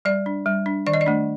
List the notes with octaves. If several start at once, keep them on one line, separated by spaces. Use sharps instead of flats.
G3 D5
D4
G3
D4
D#3 D5
D#5
D5
A3 D4